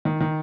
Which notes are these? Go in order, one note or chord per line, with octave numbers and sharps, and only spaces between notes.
D#3
D#3